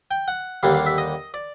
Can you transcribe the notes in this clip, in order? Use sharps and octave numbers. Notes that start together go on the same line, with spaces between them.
G5
F#5
D#2 D3 G3 A#3 D4 F5
F5
E5
D#5
D5